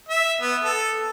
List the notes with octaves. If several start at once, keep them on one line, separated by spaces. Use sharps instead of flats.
E5
B3
A4